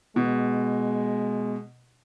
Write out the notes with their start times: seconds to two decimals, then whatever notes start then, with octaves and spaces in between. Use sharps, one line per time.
0.16 B2 G#3